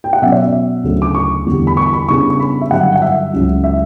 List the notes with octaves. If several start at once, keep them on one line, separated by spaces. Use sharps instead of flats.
G5
F#5
B2 F#3 C#4 E5
D5
E5
D2 C#3 F#3 A3
D6
C#6
E2 D3 G3
B5
C#6
B5
C#3 G3 B3 D4 C#6
C#6
B5
E5
G2 D3 F#3 F#5
F#5
E5
C#2 C#3 F#3 C#4
E5